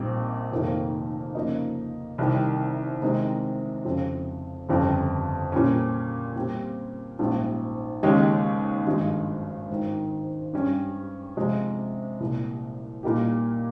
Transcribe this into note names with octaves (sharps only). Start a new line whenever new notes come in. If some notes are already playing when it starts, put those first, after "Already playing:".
Already playing: A#1 A#2 G3 C4 D#4
F1 F2 D#3 A#3
C#3 F3 A#3 D#4
C2 C3 D#3 G3
C3 D#3 G#3 C4 D#4
F2 C#3 F3 C4
G1 F2 C#3 G3 C4
A#2 G3 C#4
A#2 G3 C4 G4
A#1 G#2 G3 C#4 F4
D#2 C#3 G#3 C#4 G4
G#1 G2 F3 G#3
G#1 G#2 D#3
G2 G3 C#4
C3 F3 G#3
C2 A#2 G3
A#2 G3 A#3 D#4 G4